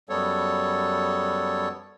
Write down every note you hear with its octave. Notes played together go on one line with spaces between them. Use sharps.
F#2 G3 B3 A4 C#5